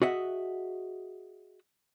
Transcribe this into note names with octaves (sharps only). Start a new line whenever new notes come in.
F#4 G#4 D#5 E5 F#5